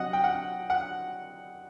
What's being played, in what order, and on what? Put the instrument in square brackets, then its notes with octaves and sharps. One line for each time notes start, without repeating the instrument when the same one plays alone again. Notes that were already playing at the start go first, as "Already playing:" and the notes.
Already playing: [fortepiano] C3 F#3 D#5 F#5
G5
F#5
F#5